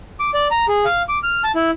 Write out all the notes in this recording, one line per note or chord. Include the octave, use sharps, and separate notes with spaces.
D6
D5
A#5
G#4
F5
D6
F6
A5
E4